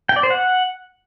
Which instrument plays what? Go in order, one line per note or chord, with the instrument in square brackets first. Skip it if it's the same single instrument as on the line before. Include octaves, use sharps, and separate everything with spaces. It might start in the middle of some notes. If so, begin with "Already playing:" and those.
[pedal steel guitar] G5
D5
C5
F#5